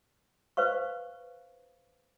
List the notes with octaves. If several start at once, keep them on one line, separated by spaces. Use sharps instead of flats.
B4 C5 F5 C#6